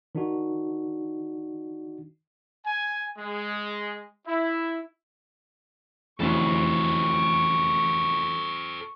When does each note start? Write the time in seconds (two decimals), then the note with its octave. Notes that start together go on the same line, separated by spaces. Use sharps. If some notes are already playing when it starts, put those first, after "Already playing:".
0.15 D#3 D4 D#4 F#4
2.66 G#5
3.17 G#3
4.28 E4
6.20 F1 D2 E3 F#3 C#4 A4 C5 C#6